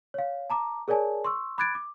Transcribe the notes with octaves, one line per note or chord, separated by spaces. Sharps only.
C#5 F5
A5 A#5 D6
G#4 A#4 C#5 D5 G#5 A5
C6 C#6 E6
B5 D6 F#6 G#6 A6 D7
D6